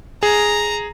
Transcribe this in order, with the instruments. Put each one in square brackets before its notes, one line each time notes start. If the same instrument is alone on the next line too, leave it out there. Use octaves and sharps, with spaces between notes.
[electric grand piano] G#4 [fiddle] A#5